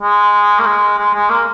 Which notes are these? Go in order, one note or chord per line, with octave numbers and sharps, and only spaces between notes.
G#3
A#3
G#3
G#3
G#3
A#3